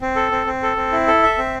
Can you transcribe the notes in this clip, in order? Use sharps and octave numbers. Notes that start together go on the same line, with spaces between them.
C4
A4
C4
C4
A4
C4
E4
A4
E5
C4